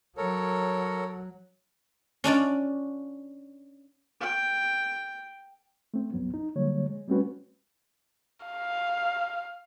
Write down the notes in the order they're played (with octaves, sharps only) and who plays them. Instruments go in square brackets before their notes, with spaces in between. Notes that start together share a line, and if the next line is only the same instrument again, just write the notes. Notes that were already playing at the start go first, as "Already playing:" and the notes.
[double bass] F#3 [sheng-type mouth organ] A4 A#4 C#5
[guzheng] C#4 D4 F4 D5
[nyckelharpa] G5
[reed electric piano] A3 C4
C#2 G2 F#3 B3
D#4
D3 F#3 G3 A#3 C#5
G#3
G3 A3 C4 C#4 F#4 B4
[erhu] F5